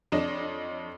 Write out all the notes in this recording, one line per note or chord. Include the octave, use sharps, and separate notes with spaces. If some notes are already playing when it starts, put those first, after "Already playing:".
F2 D4 C#5 D#5 E7